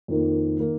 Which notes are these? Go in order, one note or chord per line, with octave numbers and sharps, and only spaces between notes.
F2 D#3 A#3
D#3 A#3